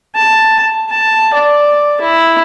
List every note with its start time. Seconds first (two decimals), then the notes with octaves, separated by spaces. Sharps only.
0.15 A5
0.90 A5
1.34 D5
2.01 E4